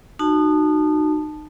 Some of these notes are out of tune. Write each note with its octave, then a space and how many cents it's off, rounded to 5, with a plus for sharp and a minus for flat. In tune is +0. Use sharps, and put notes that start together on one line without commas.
D#4 -30 F#4 -5 A5 -5